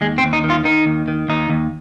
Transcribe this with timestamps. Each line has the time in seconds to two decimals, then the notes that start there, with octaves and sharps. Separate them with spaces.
0.01 D#2 G#3
0.18 C4
0.23 D#2
0.33 D#4
0.44 D#3
0.50 F4
0.65 D#3 D#4
0.86 D#2
1.08 D#3
1.29 D#2 D#4
1.49 D#2